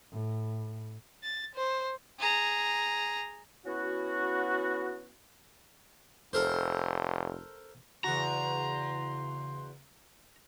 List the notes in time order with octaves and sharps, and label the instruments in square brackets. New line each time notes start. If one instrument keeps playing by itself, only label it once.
[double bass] A2
[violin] A6
C5
[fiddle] G#4 A#5
[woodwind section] B3 C#4 E4 F#4
[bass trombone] F1 [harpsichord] A4 A#4 C5
[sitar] E2 F#4 [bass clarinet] C#3 [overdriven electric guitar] A#5 [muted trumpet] C6